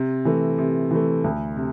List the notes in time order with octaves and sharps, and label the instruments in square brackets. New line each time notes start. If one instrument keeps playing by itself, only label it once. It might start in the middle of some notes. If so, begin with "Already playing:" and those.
Already playing: [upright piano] C3
E3 A3
C3
E3 A3
D2
C3